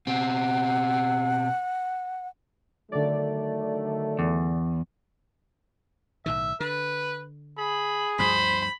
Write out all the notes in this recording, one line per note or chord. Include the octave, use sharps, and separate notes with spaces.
B2 C4 F#5
D3 D#3 F#3 A3 D5
E2
B1 A2 D#3 E5
D3 B4
G#4 B5
D2 G2 F3 C5 B5